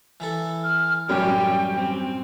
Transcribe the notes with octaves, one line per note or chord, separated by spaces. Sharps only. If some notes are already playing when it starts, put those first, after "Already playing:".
E3 E4 A4
F6
A1 F#2 G3 C#4 G5
C4